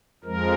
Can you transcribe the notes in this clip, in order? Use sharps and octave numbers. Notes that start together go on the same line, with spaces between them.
F2 F3 G#3 A#4